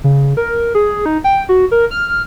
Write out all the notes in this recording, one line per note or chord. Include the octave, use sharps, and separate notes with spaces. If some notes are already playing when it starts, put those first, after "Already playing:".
C#3
A#4
G#4
D#4
G5
F#4
A#4
F6